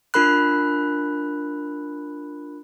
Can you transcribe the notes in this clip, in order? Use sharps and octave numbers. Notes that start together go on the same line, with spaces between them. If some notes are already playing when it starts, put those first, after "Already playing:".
D4 F4 A#4 B5 F#6